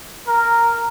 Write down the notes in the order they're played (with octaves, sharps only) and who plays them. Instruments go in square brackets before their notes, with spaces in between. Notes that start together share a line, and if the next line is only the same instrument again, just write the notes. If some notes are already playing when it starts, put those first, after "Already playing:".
[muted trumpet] A#4